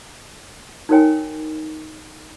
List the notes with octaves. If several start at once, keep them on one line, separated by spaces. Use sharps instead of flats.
D#4 F#4 A#4 C#5 G5 G#5